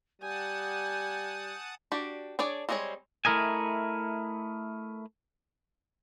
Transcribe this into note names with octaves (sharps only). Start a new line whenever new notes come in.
G3 F#5 G#5 A5 D#6 G6
D4 F#4 G4
D4 G#4 C#5 D5
G3 G#3 C4 G#4 C#5
A3 E4 A#4 D#5 G#5